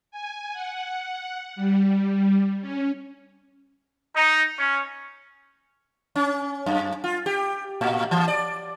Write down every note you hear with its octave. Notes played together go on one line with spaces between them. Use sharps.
G#5
F#5
G3
C#4
D#4
C#4
C#4
F#2
F4
G4
A2
E3
D5